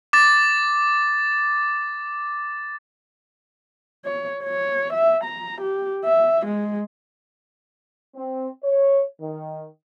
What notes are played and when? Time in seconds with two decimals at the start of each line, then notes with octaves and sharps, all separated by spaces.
0.13 D6 A6
4.05 C#5
4.44 C#5
4.93 E5
5.24 A#5
5.61 G4
6.04 E5
6.46 G#3
8.15 C4
8.63 C#5
9.21 D#3